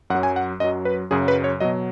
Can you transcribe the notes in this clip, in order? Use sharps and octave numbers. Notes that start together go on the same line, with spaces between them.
F#2 F#5
F#3
G#5
F#5
F#2 F#3 D#5
B4
F#2 C#3 F#3 G#4
B4
C#5
B2 F#3 D#5